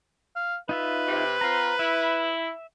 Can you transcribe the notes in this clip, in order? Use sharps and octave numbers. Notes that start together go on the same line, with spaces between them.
F5
D#4 F4 B4 E5
C3
C4 F4 A#5
E4 E5